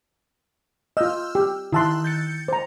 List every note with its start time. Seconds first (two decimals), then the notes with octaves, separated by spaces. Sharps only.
0.97 F4 D#5 E6 F6 G6
1.35 G4
1.72 D#3 E4 A5 C6 E6 F#6
2.04 G6 A6 C#7
2.48 C5 A#5